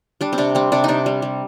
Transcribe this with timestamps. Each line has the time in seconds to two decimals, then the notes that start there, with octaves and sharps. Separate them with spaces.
0.21 G3 D4
0.33 C4
0.38 C3 D4
0.55 G3 C4
0.72 C3 D4
0.84 C3 D4 D#4
1.06 G3
1.22 G3